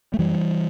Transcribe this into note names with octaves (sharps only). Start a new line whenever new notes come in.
A3
F#2 E3 G3